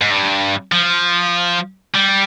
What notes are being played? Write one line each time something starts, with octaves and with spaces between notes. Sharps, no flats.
G#2
G2
F3
G3